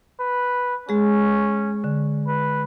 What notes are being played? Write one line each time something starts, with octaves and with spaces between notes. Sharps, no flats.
B4
G#3 C#4 G#4
D3
B4